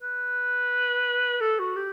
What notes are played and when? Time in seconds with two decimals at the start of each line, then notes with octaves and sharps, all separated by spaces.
0.02 B4
1.41 A4
1.59 F#4
1.76 G4